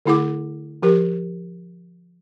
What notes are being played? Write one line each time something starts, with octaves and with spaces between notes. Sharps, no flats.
D3 A3 E4 G#4 F#5 D6
F3 G4 A#4